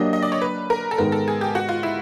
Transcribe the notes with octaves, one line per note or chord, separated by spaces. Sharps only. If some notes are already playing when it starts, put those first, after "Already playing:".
Already playing: F#3 A#3 D4 G4 D#5
D#5
D5
C#5
B4
A#4
A4
G#2 D#3 G#3 B3 A#4
A4
G#4
G4
F#4
F4
E4